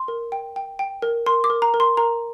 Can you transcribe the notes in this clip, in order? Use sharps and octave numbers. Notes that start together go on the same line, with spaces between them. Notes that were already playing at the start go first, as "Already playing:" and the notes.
Already playing: C6
A#4
G5
G5
G5
A#4
A#4 C6
D6
A#4
A#5
A#4
C6
A#4 A#5